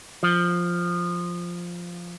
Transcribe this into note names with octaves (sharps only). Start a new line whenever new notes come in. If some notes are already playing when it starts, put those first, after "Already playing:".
F3